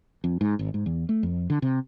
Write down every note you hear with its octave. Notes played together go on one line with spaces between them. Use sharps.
F2
G#2
G#1
G#2
E2
A3
F2
D3
C3